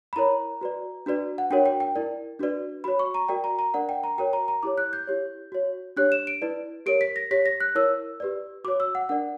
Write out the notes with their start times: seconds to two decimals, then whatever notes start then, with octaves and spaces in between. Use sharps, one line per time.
0.13 B5
0.16 E4 A#4 C#5 A#5
0.61 F#4 B4 D5
1.06 D4 F#4 B4 D5
1.38 F#5
1.50 D4 F#4 A#4 C#5 G5
1.66 G5
1.80 G5
1.96 E4 A#4 D5
2.39 D4 F#4 B4 D5
2.84 F#4 C#5 B5
2.99 C#6
3.14 A#5
3.29 F#4 A#4 D5 G5
3.44 A#5
3.59 A#5
3.74 D4 A#4 D5 F#5
3.89 G5
4.04 A#5
4.18 F#4 A#4 C#5 G5
4.33 A#5
4.48 A#5
4.63 E4 G4 C#5 D6
4.78 F#6
4.93 G6
5.07 E4 G4 C#5
5.52 F#4 C#5
5.97 D4 G4 C#5 F#6
6.12 E7
6.27 D7
6.42 E4 B4 D5
6.86 G4 A#4 C#5 D7
7.01 B6
7.16 A#6
7.31 G4 C#5 B6
7.46 A#6
7.60 F#6
7.75 E4 A#4 C#5 E6
8.20 G4 B4 D5
8.64 F#4 C#5 D6
8.80 E6
8.95 F#5
9.09 D4 A#4 D5 F#5